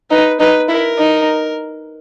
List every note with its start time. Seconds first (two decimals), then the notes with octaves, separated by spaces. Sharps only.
0.11 D#4 B4
0.40 D#4 B4
0.69 E4 A#4
0.98 D#4